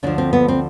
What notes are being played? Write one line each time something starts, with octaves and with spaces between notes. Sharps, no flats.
D2 D3 F3 D4
C4
B3
C4